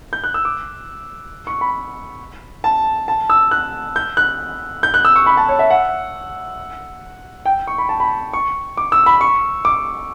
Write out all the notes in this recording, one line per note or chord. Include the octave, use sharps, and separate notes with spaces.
G6
F#6
E6
D6
C#6
B5
A5
A5
E6
F#6
G6
F#6
G6
F#6
E6
C#6
B5
A5
C#5
E5
F#5
G5
C#6
B5
A5
B5
C#6
D6
E6
B5
C#6
D6